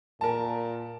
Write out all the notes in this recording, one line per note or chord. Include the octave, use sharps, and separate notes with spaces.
A#2 A#4 A5